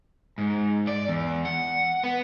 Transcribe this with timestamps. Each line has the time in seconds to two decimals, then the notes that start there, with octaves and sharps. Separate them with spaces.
0.38 G#2
0.87 D5
1.08 E2
1.45 F#5
2.04 B3